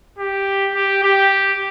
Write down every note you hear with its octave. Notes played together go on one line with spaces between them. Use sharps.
G4
G4
G4